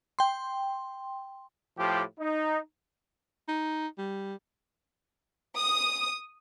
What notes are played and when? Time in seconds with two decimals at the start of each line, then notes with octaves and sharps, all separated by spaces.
0.19 G5 C6
1.77 A2 F3 G4
2.19 D#4
3.48 D#4
3.98 G3
5.57 D#6